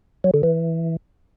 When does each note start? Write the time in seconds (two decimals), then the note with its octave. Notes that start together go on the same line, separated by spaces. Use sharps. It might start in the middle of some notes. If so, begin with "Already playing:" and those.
0.24 F#3
0.34 D3
0.43 E3